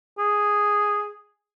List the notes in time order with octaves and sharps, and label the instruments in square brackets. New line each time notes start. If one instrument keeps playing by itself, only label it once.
[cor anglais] G#4